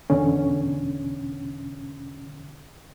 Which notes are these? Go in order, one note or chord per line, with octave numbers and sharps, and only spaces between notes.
E2 B2 D3 C#4